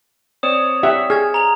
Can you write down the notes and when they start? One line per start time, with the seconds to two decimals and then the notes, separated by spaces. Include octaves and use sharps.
0.43 C4 C#5 D5 D#6 E7
0.83 G4 E5 F#5
1.10 G#4 F6 G#6
1.34 A#5 F7